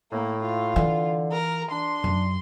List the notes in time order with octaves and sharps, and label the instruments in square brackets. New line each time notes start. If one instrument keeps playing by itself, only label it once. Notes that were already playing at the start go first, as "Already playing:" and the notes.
[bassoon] A2 [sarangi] A#3
[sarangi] F4
[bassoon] D3 [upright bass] E3
[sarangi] A#4
[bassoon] D4 [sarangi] C6
[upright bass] F#2